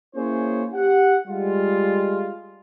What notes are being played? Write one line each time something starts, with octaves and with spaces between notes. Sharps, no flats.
A#3 C#4 E4 G#4 C5 C#5
G4 F#5
G3 G#3 F4